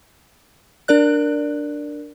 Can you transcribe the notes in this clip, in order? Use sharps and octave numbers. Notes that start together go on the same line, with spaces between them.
D4 A#4 D5 F#6